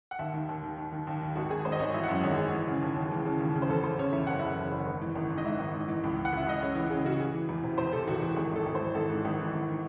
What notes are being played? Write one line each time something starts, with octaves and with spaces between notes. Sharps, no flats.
F#5
D#2 E5
D#3
D#2
D#3
D#3
D#3
D#2
D#3
G#1 F#4
G#1 G#4
G#1 C5
D#5
G#1 C#5
E3 E5
F#5
F#2 E5
G#1 C#5
G#1 G#4
E3
C#3
D#2
D#2
E3
C#3
D#2
C#3
C5
E2 A4
E2 C5
C#3 C#5
E2 E5
F#1 F#5
F#1 E5
F#1
F#1
G#1
E3
G#1
G#2
D#5
G#2 E5
G#1
G#2
E3
C#2
E3
F#5
C#2 E5
C#2 D#5
C#3 C#5
E3
C#3 G#4
C#3 F#4
E3 G#4
E3
E2
C3
E2 C5
C3 A4
E1 F#4
E3
G#1 G#4
G#1 A4
G#1
C5
E3
G#1 A4
G#2
G#1
E3
G#1
D#3